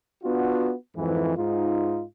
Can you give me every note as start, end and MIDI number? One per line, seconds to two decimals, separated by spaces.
0.23 0.72 59
0.23 0.72 62
0.23 0.72 65
0.23 0.72 66
0.95 1.34 41
0.95 1.34 44
0.95 1.34 52
1.36 2.03 44
1.36 2.03 63
1.36 2.03 65